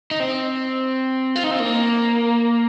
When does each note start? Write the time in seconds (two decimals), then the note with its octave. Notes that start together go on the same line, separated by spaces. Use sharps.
0.11 D#4
0.20 C4
1.36 F4
1.44 D#4
1.51 C4
1.60 A#3